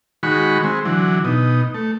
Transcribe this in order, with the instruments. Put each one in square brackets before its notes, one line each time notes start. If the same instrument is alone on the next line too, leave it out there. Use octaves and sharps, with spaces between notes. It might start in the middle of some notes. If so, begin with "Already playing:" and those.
[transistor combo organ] D#3 G#3 F#4 B5 C#6
G#3 C4
D3 E3 F#3
B2 D#4
A3